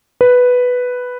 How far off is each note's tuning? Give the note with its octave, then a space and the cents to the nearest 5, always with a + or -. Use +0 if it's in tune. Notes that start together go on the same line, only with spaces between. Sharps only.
B4 +0